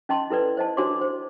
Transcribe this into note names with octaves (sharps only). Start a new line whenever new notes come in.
C#4 D#5 A5 C6
E4 A4 B4 D5
C5 D#5 A5
D4 F#4 C5 C#5 C6 D6
C5